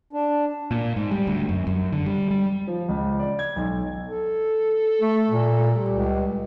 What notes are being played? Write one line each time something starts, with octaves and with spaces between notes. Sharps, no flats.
D4
A#2
G#2
G3
D2
F#2
F#2
D3
G3
G3
F3
C#2
D5
G#6
B1
A4
A3
A#2
G3
C#2